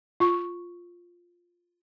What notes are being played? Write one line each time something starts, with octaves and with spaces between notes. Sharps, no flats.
F4 C#6